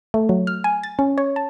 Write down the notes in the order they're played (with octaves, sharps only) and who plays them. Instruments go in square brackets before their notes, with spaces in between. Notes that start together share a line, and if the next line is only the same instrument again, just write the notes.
[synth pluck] A3
F#3
F6
G#5
A6
C#4
C#5
A5